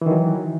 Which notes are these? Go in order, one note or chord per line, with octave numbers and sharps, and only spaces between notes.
D#3 E3 F#3